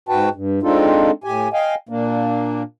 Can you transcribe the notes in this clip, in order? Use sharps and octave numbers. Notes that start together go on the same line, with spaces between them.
G#2 F#4 B4 G5 A5
G2
G#3 C4 D4 D#4 F4 A4
A2 G4 G#5
D#5 F5 G5 G#5
A#2 A#3 D4